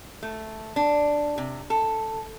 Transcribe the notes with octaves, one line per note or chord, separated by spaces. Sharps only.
A3
D4
C3
A4